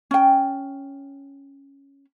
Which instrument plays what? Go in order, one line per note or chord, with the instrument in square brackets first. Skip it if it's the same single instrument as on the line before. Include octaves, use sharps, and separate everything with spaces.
[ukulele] C#4 G5